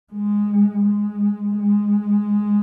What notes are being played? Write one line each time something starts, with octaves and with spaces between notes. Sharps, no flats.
G#3
G#3
G#3